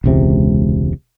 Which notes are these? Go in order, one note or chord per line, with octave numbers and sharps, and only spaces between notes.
E1 C#2 C3